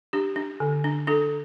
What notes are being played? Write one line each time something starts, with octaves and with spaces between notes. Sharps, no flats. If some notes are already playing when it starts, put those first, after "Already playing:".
D4 G4
D4
D3
D4
D4 A4